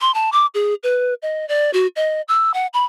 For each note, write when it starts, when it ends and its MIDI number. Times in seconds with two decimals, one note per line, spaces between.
0.01 0.14 84
0.14 0.30 81
0.32 0.46 86
0.54 0.74 68
0.83 1.14 71
1.22 1.47 75
1.49 1.71 74
1.73 1.87 66
1.96 2.21 75
2.28 2.54 88
2.54 2.67 78
2.74 2.84 83